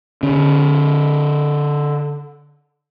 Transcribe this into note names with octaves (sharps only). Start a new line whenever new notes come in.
D3 C#4